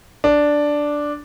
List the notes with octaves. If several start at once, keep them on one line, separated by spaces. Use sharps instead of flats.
D4